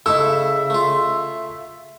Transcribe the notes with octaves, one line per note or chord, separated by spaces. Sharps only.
C#3 A3 E4 A4 D#5 E5 E6
A3 F4